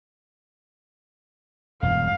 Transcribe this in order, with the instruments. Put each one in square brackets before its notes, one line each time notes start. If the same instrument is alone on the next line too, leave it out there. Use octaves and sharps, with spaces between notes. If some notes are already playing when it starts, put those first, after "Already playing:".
[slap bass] E1 G2 [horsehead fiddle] F5